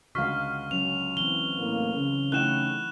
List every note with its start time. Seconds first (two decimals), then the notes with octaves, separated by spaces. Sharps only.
0.15 C#2 D3 F#4 F5 C#6 F6 B6
0.71 F#3 C#4 F7
1.17 E3 C4 G7
1.58 A2 A#3
1.95 C#3
2.32 E3 A3 D#4 E4 F#5 G5 F#6 E7